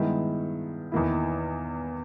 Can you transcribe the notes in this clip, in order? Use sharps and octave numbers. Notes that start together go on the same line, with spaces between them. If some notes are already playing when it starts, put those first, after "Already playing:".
Already playing: G2 D#3 G#3 B3 E4
E2 D#3 A#3 E4